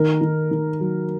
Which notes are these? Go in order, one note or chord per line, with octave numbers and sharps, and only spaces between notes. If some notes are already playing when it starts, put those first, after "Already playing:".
Already playing: D#3 A#4
D#3
D#3
F#3